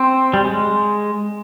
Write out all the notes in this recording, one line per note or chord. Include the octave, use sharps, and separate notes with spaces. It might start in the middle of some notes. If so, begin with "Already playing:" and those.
Already playing: C4
G3
G#3